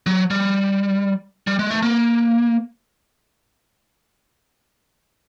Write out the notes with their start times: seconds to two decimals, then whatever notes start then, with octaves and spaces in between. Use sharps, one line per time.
0.07 F#3
0.31 G3
1.47 G3
1.59 G#3
1.71 A3
1.83 A#3